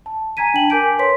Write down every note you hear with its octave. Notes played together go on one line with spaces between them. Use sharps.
A5
G#5 A#5 G#6 B6 D#7
D4 G5 A5 F#7
A#4 G#5 D6 G6 B6 D7
B4 C#5 C6 B6